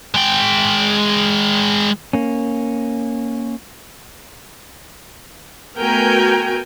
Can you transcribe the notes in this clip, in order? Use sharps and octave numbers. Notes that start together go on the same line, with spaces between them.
G#3 G5
A#3 C#4
A3 B3 F#4 A#4 G5 G#5